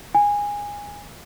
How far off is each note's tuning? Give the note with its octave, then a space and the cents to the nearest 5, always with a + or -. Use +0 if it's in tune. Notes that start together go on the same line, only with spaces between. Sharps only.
G#5 -20